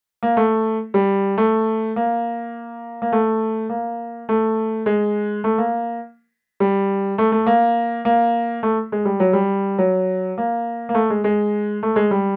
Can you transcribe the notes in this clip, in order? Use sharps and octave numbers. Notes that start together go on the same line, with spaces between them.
A#3
A3
G3
A3
A#3
A#3
A3
A#3
A3
G#3
A3
A#3
G3
A3
A3
A#3
A#3
A3
G#3
G3
F#3
G3
F#3
A#3
A#3
A3
G#3
G#3
A3
G#3
G3